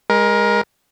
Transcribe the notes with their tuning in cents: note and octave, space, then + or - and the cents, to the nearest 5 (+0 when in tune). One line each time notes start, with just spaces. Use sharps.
G#3 -15 A#4 +20